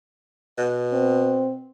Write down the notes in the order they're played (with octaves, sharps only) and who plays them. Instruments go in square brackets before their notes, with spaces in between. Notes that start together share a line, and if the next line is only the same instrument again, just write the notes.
[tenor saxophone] B2
[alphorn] C4